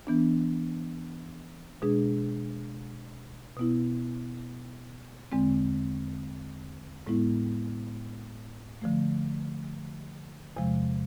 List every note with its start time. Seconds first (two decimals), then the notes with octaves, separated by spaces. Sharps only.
0.07 E3 B3 D4
1.82 B2 G#3 D4 G#4
3.57 B2 B3 E4
5.32 E2 D3 G#3 C4
7.07 A2 G#3 B3 E4
8.82 D3 F3 A3
10.57 E2 C3 F3 G#3